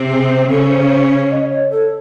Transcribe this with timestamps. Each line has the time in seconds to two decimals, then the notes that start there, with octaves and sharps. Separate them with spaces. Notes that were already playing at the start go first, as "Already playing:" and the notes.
Already playing: C3 C4
0.08 G#4
0.28 C5
0.48 C#3 C#4 A4
0.69 C5
0.84 C#5
0.89 C5
1.09 C#5
1.30 D#5
1.50 C#5
1.70 A4